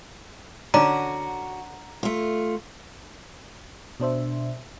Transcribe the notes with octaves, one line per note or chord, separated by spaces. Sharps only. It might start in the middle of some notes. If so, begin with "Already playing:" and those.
D3 C#4 D4 F#4 A#5
A3 F4
B2 D4 C5 E5